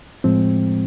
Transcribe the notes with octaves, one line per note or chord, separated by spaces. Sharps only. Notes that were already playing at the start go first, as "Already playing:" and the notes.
A2 F3 G#3 C4